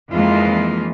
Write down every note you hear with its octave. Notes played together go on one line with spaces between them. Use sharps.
F2 D#3 E3 G#3 A#3 F4